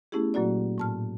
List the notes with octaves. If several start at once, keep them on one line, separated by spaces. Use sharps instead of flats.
A3 B3 C#4 E4 G4 G#4
A#2 F#3 A#3 F#4 D5
A2 A5 F6